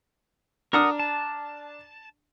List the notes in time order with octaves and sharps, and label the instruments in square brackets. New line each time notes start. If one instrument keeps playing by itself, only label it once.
[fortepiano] D4 A#5 F6 [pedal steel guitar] A#4 F#5 D#6
[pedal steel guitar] A5